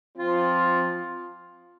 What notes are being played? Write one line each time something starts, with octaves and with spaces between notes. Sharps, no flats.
F3 C4 F4